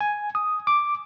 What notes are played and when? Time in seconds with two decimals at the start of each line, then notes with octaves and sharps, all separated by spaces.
0.01 G#5
0.35 D#6
0.67 D6